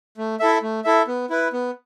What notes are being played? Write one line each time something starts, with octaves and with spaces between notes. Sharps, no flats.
A3
E4 A4 E5
A3
E4 A4 E5
B3
E4 B4
B3